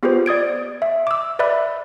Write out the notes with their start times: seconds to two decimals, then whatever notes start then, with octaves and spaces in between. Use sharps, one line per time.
0.03 B3 F4 G4 G#4 B4 C5
0.26 D5 D#6 G#6 D7
0.82 E5
1.07 D6 E6
1.39 B4 D5 E5 B5 F#6